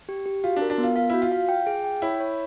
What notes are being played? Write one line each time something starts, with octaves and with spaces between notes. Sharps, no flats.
G4
G4
F4 F#4
D4
A#4
D4
B3
F4
F4 F5
E4 F#4
F4
F5
G5
G#4
G5
E4 C#5
C#5